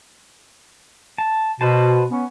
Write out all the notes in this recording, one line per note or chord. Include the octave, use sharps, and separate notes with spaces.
A5
B2 B4 C5 A5
B3 C#4